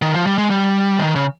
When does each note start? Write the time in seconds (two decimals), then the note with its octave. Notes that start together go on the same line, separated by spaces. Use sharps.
0.02 D#3
0.14 F3
0.27 G3
0.38 G#3
0.51 G3
0.99 D#3
1.15 C#3